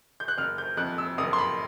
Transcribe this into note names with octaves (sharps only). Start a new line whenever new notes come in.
G6
F#6
F#1 F6
G6
F2 F#6
E6
F#1 D#6
C6
B5